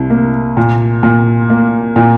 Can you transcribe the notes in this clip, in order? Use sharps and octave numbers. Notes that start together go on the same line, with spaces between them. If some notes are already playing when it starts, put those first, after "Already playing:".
Already playing: C2
A#3
A#2
A#2
A#3
A#2